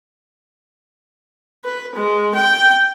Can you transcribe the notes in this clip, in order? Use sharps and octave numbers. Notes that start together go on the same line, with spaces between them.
B4
G#3
G5